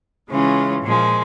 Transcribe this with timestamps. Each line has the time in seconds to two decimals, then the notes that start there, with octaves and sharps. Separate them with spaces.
0.29 C#3 E3 G#3 C#4 F4
0.82 A#2 F3 G#3